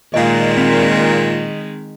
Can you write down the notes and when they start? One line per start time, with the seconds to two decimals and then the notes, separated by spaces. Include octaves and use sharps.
0.14 A#2 D#3 G#3 D#5 F5
0.57 C4 B6 F7